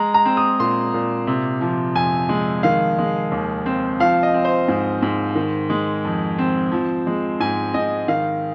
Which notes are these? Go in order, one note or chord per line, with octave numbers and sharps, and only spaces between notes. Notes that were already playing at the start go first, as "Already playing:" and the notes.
Already playing: G#3 A#5
A#5
C4
D#6
A#2 C6
A#2
C3
F3
F2 G#5
G#3
D#3 F5
G#3
D#2
C4
F3 F5
D#5
C4
C5
G#2
G#2
D#3
G#3
F2
C4
F3
G#3
G#2 G#5
G#2 D#5
D#3 F5